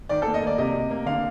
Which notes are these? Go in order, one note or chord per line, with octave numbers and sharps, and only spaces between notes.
D#3 D5
A4
A#3
D#5
A#3 D5
C3 D#5
C3
A#3
D3 F5